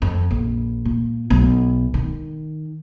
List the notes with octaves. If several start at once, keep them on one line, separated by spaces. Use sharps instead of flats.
F2
A#1
A#2
B1
D#3